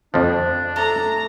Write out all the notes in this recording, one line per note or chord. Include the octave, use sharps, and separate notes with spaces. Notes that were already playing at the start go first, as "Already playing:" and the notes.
F2 F3 D4
A3 A#5